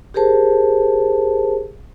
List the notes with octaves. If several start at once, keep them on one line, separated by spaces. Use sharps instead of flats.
G4 G#4 A#4 C5 A5